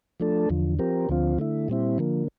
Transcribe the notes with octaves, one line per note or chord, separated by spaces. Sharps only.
F3 A3 D4 A4
E2 D3 F3
F3 C4 G4 A#4
D2 D3 F3 C4 F4
D3 A3 E4
A#2 G3 C4 E4
D3 F3 A#3